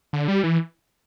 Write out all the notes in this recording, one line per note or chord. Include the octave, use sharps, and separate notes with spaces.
D3
G3
E3